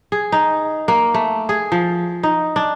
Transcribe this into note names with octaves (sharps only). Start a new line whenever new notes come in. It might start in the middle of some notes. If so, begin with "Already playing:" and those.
G#4
D#4
A#3
A3
G#4
F3
D#4
D4